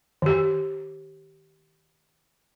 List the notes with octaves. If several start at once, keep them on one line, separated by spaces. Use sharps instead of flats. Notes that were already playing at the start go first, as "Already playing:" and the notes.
D#3 G4